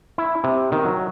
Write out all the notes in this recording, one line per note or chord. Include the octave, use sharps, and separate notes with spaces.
E4
C3
D#3
F#3